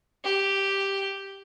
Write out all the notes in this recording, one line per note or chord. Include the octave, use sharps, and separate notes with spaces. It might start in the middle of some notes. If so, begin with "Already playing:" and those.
G4